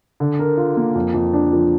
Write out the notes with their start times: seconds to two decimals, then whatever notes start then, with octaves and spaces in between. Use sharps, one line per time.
0.20 D3
0.39 A#4
0.57 F4
0.77 A#3
0.95 F2
1.14 F2
1.34 D4
1.53 F3